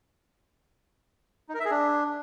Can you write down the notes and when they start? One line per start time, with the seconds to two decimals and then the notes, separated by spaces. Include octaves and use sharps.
1.49 D#4
1.54 A#4
1.60 E5
1.65 G#4
1.71 D4